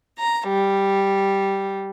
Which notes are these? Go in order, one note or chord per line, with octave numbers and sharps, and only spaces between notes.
A#5
G3